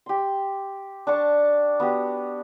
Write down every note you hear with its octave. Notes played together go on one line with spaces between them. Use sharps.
G4 C6
D4 A5 C#6
B3 F#4 G4